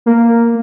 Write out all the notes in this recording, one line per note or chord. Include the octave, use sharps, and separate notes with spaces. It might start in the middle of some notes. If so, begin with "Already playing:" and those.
A#3